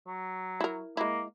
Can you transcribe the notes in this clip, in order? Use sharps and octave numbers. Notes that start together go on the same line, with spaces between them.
F#3
E4 A#4
G#3 A#3 E4